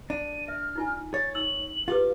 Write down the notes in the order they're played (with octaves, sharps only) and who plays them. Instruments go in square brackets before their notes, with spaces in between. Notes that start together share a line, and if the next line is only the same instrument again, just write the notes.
[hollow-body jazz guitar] D4 [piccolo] D#7
[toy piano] E5 [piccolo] F6
[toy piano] D#4 F4 G#5
[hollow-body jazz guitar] C#5 [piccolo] A6
[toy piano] D#4 E6 [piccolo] F#7
[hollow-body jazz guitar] F4 [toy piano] G4 G#4 B4